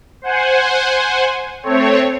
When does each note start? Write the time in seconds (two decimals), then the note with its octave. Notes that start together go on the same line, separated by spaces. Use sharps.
0.22 C5 F#5 G#5
1.63 A3 C4 C#5